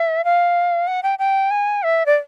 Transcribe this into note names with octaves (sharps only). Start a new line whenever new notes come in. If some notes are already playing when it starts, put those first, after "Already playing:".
Already playing: E5
F5
F#5
G5
G5
G#5
E5
D5